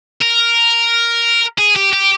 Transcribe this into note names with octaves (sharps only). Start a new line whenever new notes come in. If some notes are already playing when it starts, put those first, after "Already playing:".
A#4
G#4
G4
G4